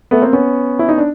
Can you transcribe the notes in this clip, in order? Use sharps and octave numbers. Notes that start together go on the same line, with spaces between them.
A3 B3
A#3 C4
B3 C#4
E4
D#4
D4